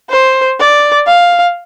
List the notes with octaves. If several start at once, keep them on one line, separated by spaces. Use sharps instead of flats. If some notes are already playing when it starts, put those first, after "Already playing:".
C5
D5
F5